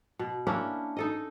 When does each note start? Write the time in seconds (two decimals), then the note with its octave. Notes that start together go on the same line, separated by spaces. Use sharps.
0.19 B2
0.47 A#3 C#4 D4 E4
0.97 D#4 A4 D#5